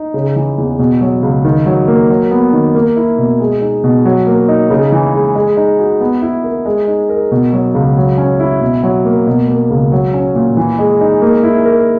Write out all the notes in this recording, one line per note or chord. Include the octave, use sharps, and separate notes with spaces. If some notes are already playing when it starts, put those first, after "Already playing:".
Already playing: D#4
C#3
E3
E2
B2
F#3
C#2
D#3
F#3
A#3
F#3
B3
D#3
A#3
E4
B2
G#3
D#4
B2
F#3
A#3
D#4
C#3
E3
G#3
G#3
D#4
F#4
B3
E4
A#4
G#3
D#4
A#4
B2
F#3
C#2
F#3
C#4
E4
B2
F#3
A#3
B2
A#3
C#2
F#3
C#4
A#2
E3
G#3
D#4
A#3
E4
A#4